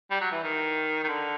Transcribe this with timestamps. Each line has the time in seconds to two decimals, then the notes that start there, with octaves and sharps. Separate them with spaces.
0.11 G3
0.21 F#3
0.32 E3
0.44 D#3
1.04 D#3
1.08 D3